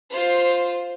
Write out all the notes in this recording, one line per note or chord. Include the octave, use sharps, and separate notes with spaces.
F4 C5